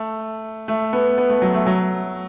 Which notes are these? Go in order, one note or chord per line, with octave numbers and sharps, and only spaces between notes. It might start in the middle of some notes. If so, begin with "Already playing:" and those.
Already playing: A3
A3
B3
B3
A3
F#3
A3
F#3